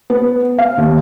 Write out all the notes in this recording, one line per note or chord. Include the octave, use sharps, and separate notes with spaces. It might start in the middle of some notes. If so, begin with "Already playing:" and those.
B3
F5
D#2